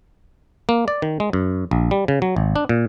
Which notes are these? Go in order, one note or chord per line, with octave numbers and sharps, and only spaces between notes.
A#3
D5
D#3
G#3
F#2
A#1
G3
C#3
F#3
G#1
D4
A#2